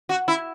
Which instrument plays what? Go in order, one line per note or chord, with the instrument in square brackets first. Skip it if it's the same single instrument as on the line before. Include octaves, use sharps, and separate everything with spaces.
[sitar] F#4
E4